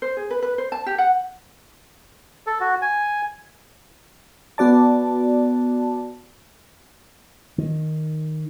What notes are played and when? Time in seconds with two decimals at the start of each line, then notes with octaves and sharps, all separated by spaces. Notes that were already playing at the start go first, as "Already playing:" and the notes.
0.02 C5
0.17 G#4
0.31 B4
0.42 B4
0.58 C5
0.72 A5
0.86 G4
0.98 F#5
2.47 A4
2.60 F#4
2.82 G#5
4.58 B3 F#4 D5 A5
7.58 D#3